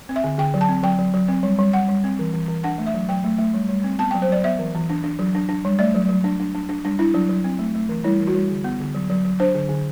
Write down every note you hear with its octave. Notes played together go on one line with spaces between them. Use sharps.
C4
E5
D3
D3 G5
F#3
A5
C4
F#3 G5
F#3
F#3
C4
G3
G3
G3 F#5
G3
C4
E3
E3
E3
D4 F#5
A3
E5
F#3
F#3 G5
A3
A3
G3
G3
C4
B3 A5
F#3 G5
C5
F#3 D5
B3 E5
E3
E3
D4
D4
F#3
D4
D4
G3
A3 D5
F#3
F#3
D4
D4
D4
D4
G3 D4
D4 E4
F#3 D4
F#3
C4
A3
A3
E3
G3 E4
E3
F#4
G3
D3
B3
D3
F#3
F#3
F#3
D4 C5
D3
D3